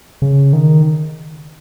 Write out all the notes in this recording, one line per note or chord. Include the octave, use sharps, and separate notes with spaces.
C#3
D#3